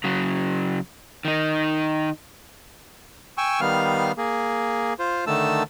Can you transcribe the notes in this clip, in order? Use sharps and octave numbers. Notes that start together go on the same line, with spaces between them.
C#3 F#3
D#3 D#4
G5 G#5 C#6 E6
D#3 G3 B3 F5 F6
A#3 G#4
F4 C5
D3 D#3 A3 A5 E6